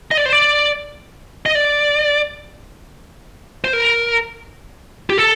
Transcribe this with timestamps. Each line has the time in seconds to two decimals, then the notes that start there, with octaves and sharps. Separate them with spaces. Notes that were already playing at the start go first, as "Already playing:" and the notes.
0.11 D#5
0.17 D5
0.26 C5
0.33 D5
1.46 D#5
1.55 D5
3.64 C5
3.73 A#4
5.10 G4
5.18 A4